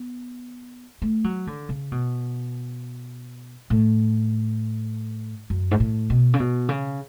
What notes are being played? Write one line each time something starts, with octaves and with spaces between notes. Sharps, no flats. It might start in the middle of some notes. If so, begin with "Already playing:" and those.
Already playing: B3
A3
F#3
D3
C#3
B2
A2
F#2
G#2
A2
B2
C#3
B2
C#3